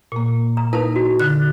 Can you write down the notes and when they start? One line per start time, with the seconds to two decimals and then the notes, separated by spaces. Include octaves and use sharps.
0.12 A#2 A#3
0.57 A#5
0.73 D#4 E4 A#4 B4 A5
0.96 F#4
1.20 D3 F#6